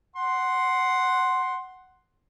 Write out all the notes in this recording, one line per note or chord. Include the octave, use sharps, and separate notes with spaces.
F#5 C6